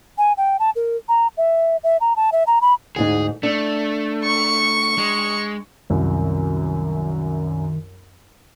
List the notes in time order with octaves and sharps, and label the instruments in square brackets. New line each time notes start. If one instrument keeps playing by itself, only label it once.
[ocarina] G#5
G5
A5
A#4
A#5
E5
E5
A#5
A5
E5
A#5
B5
[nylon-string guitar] D2 G#2 D#4 [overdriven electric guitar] G#4
[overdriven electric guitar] A3 [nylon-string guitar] D4
[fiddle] C#6
[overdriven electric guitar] G#3
[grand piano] C2 F#2 [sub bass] D#3